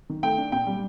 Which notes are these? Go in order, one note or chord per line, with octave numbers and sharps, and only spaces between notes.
D#3
A3 G5
D4
A#2 G5
G3